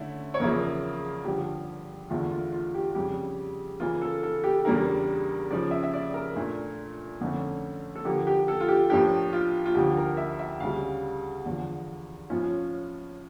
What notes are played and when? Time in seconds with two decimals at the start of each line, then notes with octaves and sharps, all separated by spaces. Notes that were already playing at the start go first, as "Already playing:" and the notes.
Already playing: D3 A3 C#4 E4
0.34 C#5
0.40 E2 C#3 F3 A#3 E4 A#4
1.25 G2 D3 F3 G4
2.10 E2 D3 A3 E4 F4
2.31 F4
2.52 F4
2.74 G4
2.95 F2 C#3 G3 G4
3.80 C#3 E3 A#3 F4
4.02 A4
4.23 A4
4.44 G4
4.65 E2 C#3 G3 A#3 D4 A#4
5.51 C#3 F3 C#4 D5
5.71 E5
5.83 E5
5.93 D5
6.14 A#4
6.35 A#2 A3 D4
7.21 F2 D3 A3 C#4
7.96 A4
8.05 D3 F3 A#3 G4
8.27 G4
8.48 A4
8.60 F4
8.68 G4
8.90 A2 F3 A#3 D4 G4
9.33 F4
9.66 F4
9.75 D2 D3 F3 G4
9.97 A#4
10.17 E5
10.39 E5
10.60 D2 C#3 G3 F5
11.45 E2 D3 F3
12.30 A2 F3 C#4 F4